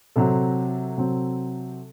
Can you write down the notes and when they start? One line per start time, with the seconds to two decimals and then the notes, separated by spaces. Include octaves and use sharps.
0.16 C3 F#3 C4 A4
0.97 C3 F#3 C4